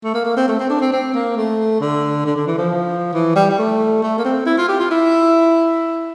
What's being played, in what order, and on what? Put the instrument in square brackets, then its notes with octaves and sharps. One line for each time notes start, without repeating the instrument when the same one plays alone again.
[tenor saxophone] A3
A#3
A#3
C4
A3
C4
D4
C4
C4
A#3
A3
D3
D3
D3
E3
F3
E3
G3
G3
A3
A3
A#3
C4
E4
F4
G4
F4
E4